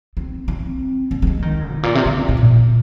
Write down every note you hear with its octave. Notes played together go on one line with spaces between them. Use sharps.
C4
C4
A#3
G3
G#3
D#3
G#2
A#2
C3
D3
G#2
A#2